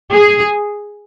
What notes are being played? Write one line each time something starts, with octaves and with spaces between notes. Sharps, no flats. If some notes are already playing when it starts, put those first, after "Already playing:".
G#4